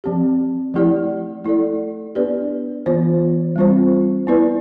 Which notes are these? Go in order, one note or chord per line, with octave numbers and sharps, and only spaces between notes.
F3 C4 G4
F3 A3 E4 G4 D5
A3 E4 A4 D5
B3 D4 G4 B4 D5
E3 B3 F4 C5
G3 C4 F4 C5
B3 E4 B4 D5